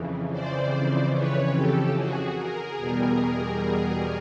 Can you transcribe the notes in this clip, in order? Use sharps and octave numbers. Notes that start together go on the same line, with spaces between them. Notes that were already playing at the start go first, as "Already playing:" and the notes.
Already playing: F2 C#3 E3
C5 D5
B4 C#5
G4 A4
F#4 G#4
G#4 A#4
E2 B2 G3